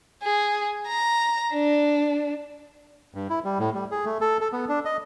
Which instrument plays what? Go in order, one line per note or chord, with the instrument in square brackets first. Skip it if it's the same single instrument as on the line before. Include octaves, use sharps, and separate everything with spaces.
[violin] G#4
A#5
D4
[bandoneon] G2
E4
G3
A2
G3
G#4
A3
A4
A4
B3
D4
D#5